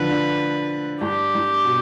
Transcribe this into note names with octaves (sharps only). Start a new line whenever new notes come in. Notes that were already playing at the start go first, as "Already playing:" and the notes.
Already playing: D3 F3 B4
D3
G2 G4
G2
B2